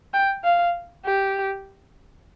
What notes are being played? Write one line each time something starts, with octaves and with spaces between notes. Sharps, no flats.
G5
F5
G4